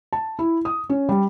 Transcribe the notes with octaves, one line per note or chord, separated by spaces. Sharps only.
A5
E4
D#6
C#4
G3